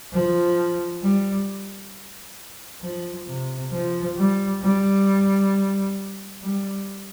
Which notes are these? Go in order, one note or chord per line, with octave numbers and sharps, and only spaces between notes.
F3
G3
F3
C3
F3
G3
G3
G3